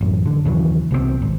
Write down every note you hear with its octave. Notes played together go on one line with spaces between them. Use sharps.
A1 F#2
D3
D#2 C#3 E3 F#3
C2 B2 E3 C4
G#1